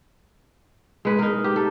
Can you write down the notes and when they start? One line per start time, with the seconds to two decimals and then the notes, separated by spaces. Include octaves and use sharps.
1.05 G#3 B4
1.19 D#4 A#4
1.44 G4
1.56 A4